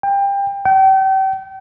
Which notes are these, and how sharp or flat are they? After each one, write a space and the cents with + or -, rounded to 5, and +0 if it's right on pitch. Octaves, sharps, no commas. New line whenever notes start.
G5 +25
G5 -35